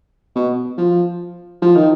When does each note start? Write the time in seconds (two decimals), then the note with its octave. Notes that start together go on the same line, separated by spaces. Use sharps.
0.36 B2
0.78 F3
1.62 F3
1.76 D#3